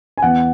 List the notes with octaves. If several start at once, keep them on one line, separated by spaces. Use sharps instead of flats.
G#5
E2 F#5